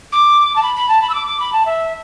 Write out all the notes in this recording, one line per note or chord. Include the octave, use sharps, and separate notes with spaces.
D6
A5
B5
B5
A5
B5
E6
D6
D6
B5
A5
E5